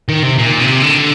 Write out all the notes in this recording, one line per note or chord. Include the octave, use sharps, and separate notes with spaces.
D#3
C3
A#2
C3
D3